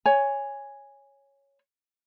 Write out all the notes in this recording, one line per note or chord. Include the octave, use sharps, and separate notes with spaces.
C#5 G#5